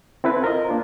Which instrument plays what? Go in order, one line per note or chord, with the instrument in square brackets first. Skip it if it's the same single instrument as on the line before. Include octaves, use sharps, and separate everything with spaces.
[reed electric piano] C4 E4 A4 B4
F4 A#4 C5 D#5
A#3 D4 F4